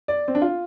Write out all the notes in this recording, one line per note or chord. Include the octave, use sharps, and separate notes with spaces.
D5
C4
D4
F4